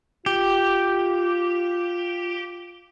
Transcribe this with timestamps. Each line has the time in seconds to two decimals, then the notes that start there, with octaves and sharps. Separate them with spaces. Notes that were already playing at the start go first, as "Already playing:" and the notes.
0.26 F4 G4